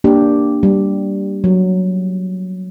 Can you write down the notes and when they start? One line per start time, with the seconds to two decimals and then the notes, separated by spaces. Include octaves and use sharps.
0.04 A#3 D4 G4
0.63 G3
1.44 F#3